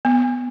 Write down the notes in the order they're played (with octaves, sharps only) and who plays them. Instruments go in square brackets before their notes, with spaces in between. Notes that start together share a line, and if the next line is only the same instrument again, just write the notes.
[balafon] B3